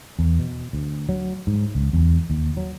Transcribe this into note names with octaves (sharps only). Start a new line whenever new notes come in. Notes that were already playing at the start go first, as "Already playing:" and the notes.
E2
B2
D2
F#3
G#2
C#2
E2
D#2
F#3